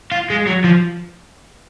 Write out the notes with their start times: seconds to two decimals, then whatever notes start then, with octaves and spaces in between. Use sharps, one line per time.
0.12 F4
0.30 G#3
0.47 F#3
0.64 F3